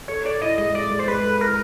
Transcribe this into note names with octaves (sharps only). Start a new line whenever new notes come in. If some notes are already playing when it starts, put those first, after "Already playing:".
A4 C#5
A4 D5
E4 D#5
G#3 D#5
G#3 D5
G#3
C5
G#3 B4
A4
E4 A#4